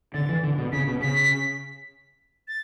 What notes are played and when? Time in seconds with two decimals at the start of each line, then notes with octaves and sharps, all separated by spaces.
0.14 D3 A6
0.29 E3
0.44 D3
0.58 B2
0.72 C#3 B6
0.87 B2
1.00 C#3 B6
2.48 A6